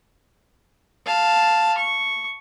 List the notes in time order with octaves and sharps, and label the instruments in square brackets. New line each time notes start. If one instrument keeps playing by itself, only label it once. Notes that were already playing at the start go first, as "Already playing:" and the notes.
[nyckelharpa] F5 A5
C#6